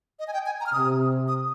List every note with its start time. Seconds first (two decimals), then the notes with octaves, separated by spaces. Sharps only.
0.19 D#5
0.28 G#5
0.33 G5
0.46 G#5
0.60 A#5
0.66 F6
0.73 C3 D#6
1.28 D#6